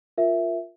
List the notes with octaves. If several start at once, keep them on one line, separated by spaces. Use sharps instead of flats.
F4 A#4 E5